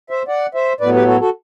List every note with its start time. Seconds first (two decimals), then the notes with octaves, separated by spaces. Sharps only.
0.10 C5 E5
0.28 D5 F#5
0.54 C5 E5
0.80 A2 F#3 B3 B4 D5
0.94 G4 B4
1.07 F#4 A4
1.20 F#4 A4